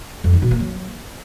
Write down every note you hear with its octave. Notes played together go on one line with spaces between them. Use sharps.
F2
D#3
B2
A#3
F#3